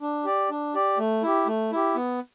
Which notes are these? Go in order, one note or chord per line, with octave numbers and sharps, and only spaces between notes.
D4
G4 D5
D4
G4 D5
A3
E4 G4
A3
E4 G4
B3